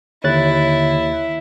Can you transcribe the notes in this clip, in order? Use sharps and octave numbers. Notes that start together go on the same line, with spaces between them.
D#2 D3 E4 C#5 F#6 A6